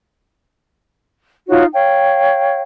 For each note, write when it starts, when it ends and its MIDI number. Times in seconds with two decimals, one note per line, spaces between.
1.49 1.64 63
1.49 1.64 65
1.49 1.64 66
1.49 1.64 73
1.73 2.61 73
1.73 2.61 77
1.73 2.61 79